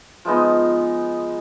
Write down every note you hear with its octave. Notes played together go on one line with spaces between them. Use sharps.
F3 G#3 B3 D#4